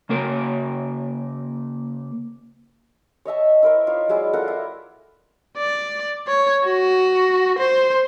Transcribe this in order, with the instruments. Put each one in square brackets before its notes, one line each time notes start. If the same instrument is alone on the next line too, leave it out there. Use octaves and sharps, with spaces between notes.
[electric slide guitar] C#3 A#3 A#4
[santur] C#5 D#5 E5 A5
E4 A#4 C5
D#4 F4 C#5
F#3 G#3 E4 D5
F4 A4 A#4 F#5
E4
[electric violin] D5
C#5
F#4
C5